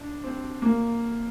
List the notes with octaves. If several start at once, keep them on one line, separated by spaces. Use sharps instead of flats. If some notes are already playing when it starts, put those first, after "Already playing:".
Already playing: D4
C4
A#3